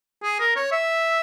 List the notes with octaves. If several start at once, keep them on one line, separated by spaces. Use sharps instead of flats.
G#4
A#4
C#5
E5